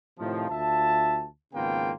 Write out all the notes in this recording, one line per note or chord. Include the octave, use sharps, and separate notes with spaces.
A2 C3 D#3 F3
D2 F4 E5 A5
G#1 C#3 A#3 B3 F4 G5